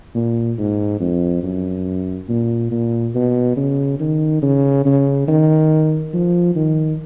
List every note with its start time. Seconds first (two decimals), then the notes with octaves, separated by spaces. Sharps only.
0.14 A#2
0.58 G#2
1.00 F2
1.43 F#2
2.28 A#2
2.71 A#2
3.15 B2
3.57 C#3
4.00 D#3
4.42 C#3
4.85 C#3
5.28 D#3
6.13 F3
6.55 D#3